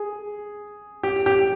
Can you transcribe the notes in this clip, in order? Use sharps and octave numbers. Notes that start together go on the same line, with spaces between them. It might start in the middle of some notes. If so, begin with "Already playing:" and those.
Already playing: G#4
G4
G4